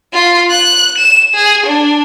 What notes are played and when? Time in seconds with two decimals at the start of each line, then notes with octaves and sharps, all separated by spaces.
0.13 F4
0.50 F#6
0.98 E7
1.34 G#4
1.66 D4